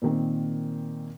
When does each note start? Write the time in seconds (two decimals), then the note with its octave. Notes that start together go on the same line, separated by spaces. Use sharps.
0.02 A#2 D#3 C4